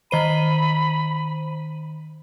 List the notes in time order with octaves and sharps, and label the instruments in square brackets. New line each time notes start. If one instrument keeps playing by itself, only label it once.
[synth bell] D#3 C5 D#7 [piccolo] B5